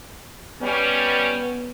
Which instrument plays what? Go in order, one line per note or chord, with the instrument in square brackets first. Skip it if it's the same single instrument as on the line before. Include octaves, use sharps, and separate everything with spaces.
[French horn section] G3 C#4 [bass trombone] B3